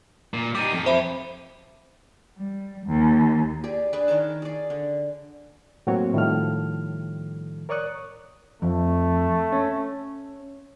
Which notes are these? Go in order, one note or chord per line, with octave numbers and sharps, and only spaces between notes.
A#2
G3 D#4 D6 D#7
F2
C5 E5 B5
G3
D#2
G4 G#4 D5
D4 G#4 B4 D5
D#3 A#4 C#5 A5
G#4 D5
D3
A2 F#3 A#3 C4 F#4 C#5
A2 D#3 F3 G3 A4 F6
A#4 C#5 D5 C#6 D#6 F#6
F2 A3
C#4